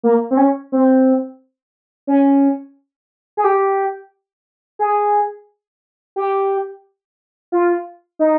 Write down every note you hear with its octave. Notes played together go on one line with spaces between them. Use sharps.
A#3
C4
C#4
C4
C#4
G#4
G4
G#4
G4
F4
D#4